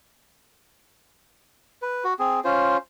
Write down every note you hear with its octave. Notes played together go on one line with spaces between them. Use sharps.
B4
F#4
C4 G#4
C#4 F4 C5